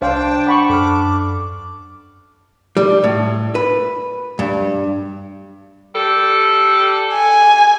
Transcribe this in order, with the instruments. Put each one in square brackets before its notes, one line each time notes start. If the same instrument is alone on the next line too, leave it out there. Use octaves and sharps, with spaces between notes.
[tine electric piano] C2 [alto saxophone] D4 [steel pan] C5 F5 [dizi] G5
[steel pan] F#5 B5 C#6 [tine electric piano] D6
[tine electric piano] F#2 F6 [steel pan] A4 [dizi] D6
[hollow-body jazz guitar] G3
A2
B4
G2
[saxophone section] G3 A4
[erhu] G#5